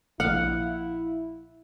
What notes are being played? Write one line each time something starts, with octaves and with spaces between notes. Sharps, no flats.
A#1 E4 F5 F#5